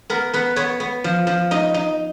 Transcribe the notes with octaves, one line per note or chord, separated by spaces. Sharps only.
B3 A#4
B3 B4
B3 C#5
B3
F3
F3
D#4 D#5
D#4